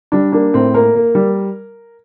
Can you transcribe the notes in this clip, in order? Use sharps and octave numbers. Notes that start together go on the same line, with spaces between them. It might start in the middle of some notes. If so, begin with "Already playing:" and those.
G3 D4
A#3 D4
A2 C4
A#3 A#4
A#3
G3